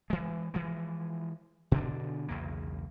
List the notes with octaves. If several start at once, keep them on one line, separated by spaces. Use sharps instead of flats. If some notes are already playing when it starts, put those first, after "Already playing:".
E3 G#3
E3 F3 G#3
B2 D3 D4
B1 E2 C#3 A#3